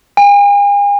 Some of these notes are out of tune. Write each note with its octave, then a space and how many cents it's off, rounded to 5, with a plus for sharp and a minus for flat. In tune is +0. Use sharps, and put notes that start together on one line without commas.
G#5 -45